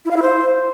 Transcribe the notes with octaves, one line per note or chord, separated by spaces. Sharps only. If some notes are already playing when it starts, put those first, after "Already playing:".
E4
F5
E4
C5